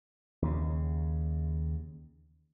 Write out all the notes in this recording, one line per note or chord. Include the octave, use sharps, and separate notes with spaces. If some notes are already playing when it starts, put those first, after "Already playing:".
D#2 C#3